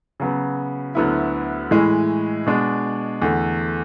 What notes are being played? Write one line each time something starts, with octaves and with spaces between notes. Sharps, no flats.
C#3 F#3 B3
D2 D3 F#3 B3 E4
A2 E3 G#3
B2 G#3 D4
E2 D3 A3